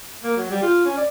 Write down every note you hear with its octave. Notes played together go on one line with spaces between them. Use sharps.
A#3
F#3
G3
F4
C#4
D5